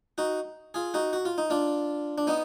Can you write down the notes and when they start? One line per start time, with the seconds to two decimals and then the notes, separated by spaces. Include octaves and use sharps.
0.18 D#4 F#4
0.74 F4 G#4
0.94 D#4 F#4
1.13 F#4
1.25 F4
1.38 D#4
1.50 D4 F4
2.18 D4
2.27 B3 D#4